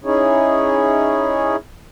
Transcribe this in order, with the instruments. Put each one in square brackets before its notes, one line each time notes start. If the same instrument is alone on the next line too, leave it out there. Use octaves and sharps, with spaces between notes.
[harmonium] C#4 D#4 E4 G#4 C#5